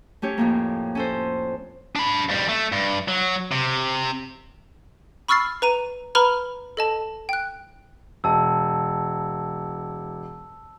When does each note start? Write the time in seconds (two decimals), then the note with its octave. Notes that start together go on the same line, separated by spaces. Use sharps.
0.22 A3 C#4 G4 C#5
0.38 F2 A2 A#3
0.95 C#4 A4 C5
1.96 D4 B5
2.29 F2 G3
2.49 A3
2.72 G2
3.08 F#3
3.52 C3
5.28 B5 C#6 E6 F6 A6 C7
5.62 B4 A#5 D#7
6.15 B4 A#5 B5 F6 G7
6.77 A4 D#5 A5
7.29 G5 F#6
8.24 E1 A5 E6